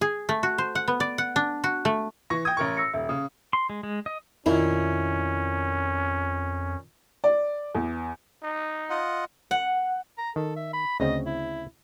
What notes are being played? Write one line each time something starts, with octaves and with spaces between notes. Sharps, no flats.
G#4
A3
F#4
C5
F#5
B3
D5
F#5
D4
F#4
A3
E3 C#6 A#6
G5 D#6 G#6
A1 A#4 C#6
E6 A#6 C#7
D#1 E5
C#3 D#6
C6
G#3
G#3
D#5
F2 A#2 D#3 C#4 E4
D5
E2
D#4
F4 D#5 F#5
F#5
A#5
D#3 A4
E5
B5
D2 C#3 C4 D#5
E4